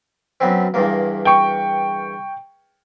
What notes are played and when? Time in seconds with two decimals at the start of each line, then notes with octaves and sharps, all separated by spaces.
0.40 F#2 B3 C4
0.74 E2 G2 A#3
1.25 G5 C#6